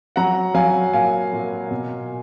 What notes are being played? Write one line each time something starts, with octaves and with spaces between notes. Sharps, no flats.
F#3 F#5 A#5
F#3 F5 G#5
A#2 F5 G#5
A#2
B2